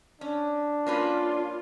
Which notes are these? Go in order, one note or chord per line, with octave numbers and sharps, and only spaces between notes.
C#4 D4
A#3 C#4 F4 B4